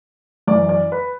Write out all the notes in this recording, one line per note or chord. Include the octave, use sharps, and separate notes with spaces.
F#2 E3 D5
D5
B4